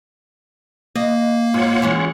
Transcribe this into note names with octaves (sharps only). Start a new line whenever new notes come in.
A#3 D#5
G#2 F4 C#5 F#5
E3 G#3 C#4